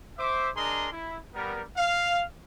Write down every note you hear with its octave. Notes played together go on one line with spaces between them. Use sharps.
C5 E5 D6
D4 G#4 A#4 D#5 A#5 C6
E4
G3 B3 A#4
F5